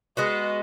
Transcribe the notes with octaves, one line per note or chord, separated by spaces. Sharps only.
G#3 B3 F#4 D#5